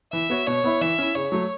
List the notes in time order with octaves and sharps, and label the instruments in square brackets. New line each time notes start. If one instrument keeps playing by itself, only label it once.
[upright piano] E3 [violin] E5
[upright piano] B3 F#4 C#5
[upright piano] B2 [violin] C#5
[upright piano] B3 E4 B4 E5
[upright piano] E3 [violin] E5
[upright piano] C#4 E4
[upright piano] C#3 [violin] C#5
[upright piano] F#3 A3